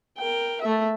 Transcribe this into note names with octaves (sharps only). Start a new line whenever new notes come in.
A#4 G5
A3 E5